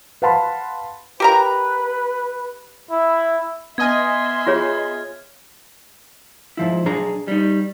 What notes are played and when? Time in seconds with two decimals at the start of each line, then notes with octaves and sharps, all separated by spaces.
0.22 B4 F5 F#5 A5 B5 C6
1.20 G4 A#4 B4 A#5
2.91 E4
3.78 B3 D#5 E5 G#5 C6 F6 G#6
4.47 F4 G#4 C#5
6.57 G#2 F3 E4
6.86 B1 D4 G#4 A#5
7.28 G3 D#4